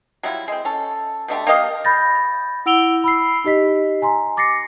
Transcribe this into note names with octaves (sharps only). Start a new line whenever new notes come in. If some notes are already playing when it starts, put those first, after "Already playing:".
F#3 G3 E4 F4
G#3 C4
C#4 A4
B2 D3 A3 G4
A#3 G4 D#5 F5
B5 G6 A6 A#6
E4 F#5 E6 D7 F7 G7
B5 E6 C7
D#4 G4 D#5 B6
G#5 A#5 C6
D6 A6 A#6 C7 C#7